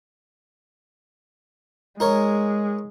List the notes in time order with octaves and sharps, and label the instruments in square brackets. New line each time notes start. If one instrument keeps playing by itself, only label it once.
[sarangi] G#3 [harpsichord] D#4 A#4 C#5